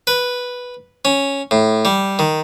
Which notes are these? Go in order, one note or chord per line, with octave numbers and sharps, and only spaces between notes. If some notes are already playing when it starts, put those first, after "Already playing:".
B4
C#4
A2
G3
D#3